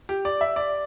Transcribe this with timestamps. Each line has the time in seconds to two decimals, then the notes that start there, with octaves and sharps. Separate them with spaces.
0.09 G4
0.25 D5
0.41 E5
0.56 D5